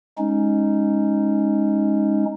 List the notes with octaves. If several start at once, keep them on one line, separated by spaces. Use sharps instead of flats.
G#3 C#4 D#4